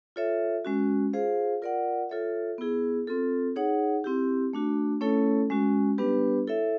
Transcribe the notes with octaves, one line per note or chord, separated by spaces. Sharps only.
F4 A4 C#5 E5
G#3 C#4 F#4
F4 G#4 C5 F5
F4 A#4 D5 F#5
F4 A4 C#5 E5
B3 E4 G#4
C4 F4 A4
D#4 G#4 C#5 F#5
C4 E4 G4
A3 D4 F#4
A3 C#4 E4 A4 C#5
G#3 C#4 F#4
G3 B3 D4 G4 B4
E4 A4 C#5 E5